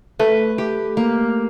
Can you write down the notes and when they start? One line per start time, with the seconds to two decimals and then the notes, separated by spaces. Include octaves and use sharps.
0.19 A3 B4
0.58 G4
0.97 A#3